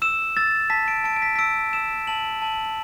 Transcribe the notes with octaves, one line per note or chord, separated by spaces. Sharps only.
E6 E7
E6 A6
A5 B6
D7
A5 D7
D7
B6
B6
E6 D7
E6 E7
A5 F#7
A5 F#7